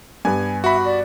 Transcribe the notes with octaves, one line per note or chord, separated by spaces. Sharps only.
G2 B3 G#5
F#4 E5 B5
D5